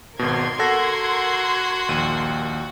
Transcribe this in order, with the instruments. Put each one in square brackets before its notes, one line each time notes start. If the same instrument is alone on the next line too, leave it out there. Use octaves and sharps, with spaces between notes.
[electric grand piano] G#1 B2 [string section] A#4 C6 G#6
[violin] F#4 [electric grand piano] A4 F#5 A#6
[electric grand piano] A#1 D#2 D#7